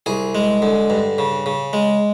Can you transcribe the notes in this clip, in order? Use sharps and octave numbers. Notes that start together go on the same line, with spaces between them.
C2 G#4
G#3
D3
G2
C#3
C#3
G#3